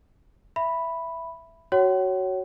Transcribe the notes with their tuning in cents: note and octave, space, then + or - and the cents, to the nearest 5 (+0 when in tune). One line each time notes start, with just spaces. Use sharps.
E5 +10 B5 +0
F#4 +15 C#5 +0 F#5 +45